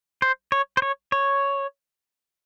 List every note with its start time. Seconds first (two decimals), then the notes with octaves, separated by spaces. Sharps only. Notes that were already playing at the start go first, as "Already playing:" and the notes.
0.22 C5
0.52 C#5
0.77 C5
0.82 C#5
1.12 C#5